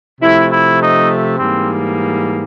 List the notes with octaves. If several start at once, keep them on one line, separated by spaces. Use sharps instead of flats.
C3 F3 A3 E4
E4
D#4
G#2 E3 G3 A#3 C4